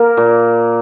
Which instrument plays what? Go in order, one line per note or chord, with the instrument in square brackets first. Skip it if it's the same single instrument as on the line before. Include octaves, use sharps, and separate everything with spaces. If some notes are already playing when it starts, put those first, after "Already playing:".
Already playing: [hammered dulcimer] A#3 [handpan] A#4
[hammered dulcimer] A#2